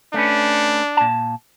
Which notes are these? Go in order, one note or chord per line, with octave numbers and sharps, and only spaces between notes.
A3 C#4 D4 B4
A#2 A5